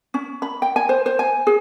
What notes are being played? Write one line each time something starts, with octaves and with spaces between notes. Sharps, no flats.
C#4
B5
G5
G#5
C5
C5
G#5
G#4